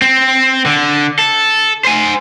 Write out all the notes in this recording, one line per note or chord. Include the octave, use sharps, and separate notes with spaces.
C4
D3
A4
C5 G#5